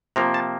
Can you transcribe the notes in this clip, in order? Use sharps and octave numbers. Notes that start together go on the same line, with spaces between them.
C3 F3 A#3 A#5
A5